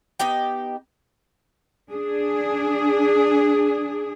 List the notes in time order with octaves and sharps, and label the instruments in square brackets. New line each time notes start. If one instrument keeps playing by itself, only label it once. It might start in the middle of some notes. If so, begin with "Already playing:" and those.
[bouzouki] B3 D#4 G4 G5
[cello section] D4 G#4